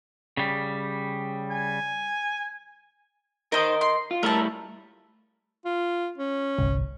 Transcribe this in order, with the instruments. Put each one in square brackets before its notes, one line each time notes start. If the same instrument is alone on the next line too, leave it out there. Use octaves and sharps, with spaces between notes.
[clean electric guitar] C#3 G3
[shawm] G#5
[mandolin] D#4 C5 [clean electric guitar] A#4 D#5
[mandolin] C6
[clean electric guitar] F4
[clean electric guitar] G3 A3 E4 [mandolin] A#4 A5
[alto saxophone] F4
C#4
[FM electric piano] G1 C2